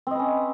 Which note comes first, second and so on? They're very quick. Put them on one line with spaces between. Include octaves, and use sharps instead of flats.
C4 D#5 B4 C#4